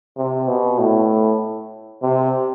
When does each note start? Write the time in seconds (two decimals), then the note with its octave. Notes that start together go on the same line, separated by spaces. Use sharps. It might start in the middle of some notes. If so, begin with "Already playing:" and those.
0.17 C3
0.48 B2
0.79 A2
2.02 C3